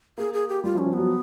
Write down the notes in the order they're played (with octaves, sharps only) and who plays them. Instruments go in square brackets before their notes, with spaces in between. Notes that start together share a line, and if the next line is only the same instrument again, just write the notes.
[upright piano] A#3 [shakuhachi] G#4
[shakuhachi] G#4
G4
[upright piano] G3 [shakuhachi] F4
[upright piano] F3
[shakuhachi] C#4
[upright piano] F3
[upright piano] F#3 [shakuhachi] B3